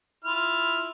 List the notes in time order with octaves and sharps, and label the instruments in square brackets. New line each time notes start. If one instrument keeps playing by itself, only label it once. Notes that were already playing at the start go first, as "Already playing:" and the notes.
[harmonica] E4 F4 F6